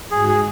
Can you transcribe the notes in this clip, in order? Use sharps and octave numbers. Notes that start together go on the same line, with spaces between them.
G#2 D#3 G#3 F#4 G#4
G#4